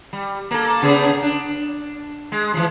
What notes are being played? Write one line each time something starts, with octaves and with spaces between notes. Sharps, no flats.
G3
A#3 A4
C#3 B3 G#4
D4
G#3
E3 F3